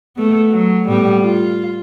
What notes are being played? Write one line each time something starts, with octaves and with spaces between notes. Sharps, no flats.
A3 B3
F#3
A2 G3 B3
F4